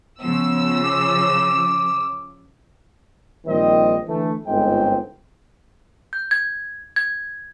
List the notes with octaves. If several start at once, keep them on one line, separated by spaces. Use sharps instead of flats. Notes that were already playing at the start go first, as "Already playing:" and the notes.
C#3 F3 B3 E6
D6
A#1 D#3 G3 C4 D#5
D3 E3 A3
G1 C#2 G#2 C4 G5
G6
G#6
G#6